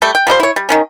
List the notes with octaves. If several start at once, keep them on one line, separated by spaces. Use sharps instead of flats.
G3 A3 G5
G5
F3 G3 D#4 C5
E4 C#5
G3
D#3 F3 C#4